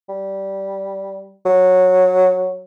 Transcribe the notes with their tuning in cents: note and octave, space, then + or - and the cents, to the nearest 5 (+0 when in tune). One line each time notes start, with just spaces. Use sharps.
G3 -10
F#3 -10